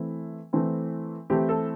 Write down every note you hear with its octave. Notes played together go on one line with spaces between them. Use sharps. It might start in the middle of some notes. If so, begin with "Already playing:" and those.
Already playing: E3 A3 C4 E4
E3 A3 C4 E4
E3 A3 C4 E4 G4
A4